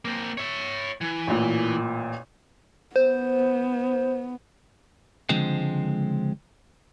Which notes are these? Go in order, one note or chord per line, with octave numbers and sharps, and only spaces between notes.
A#3 C4
C#5 E5
E3
A1 A#2
B3 C5
C#2 D3 F3 G#3 C4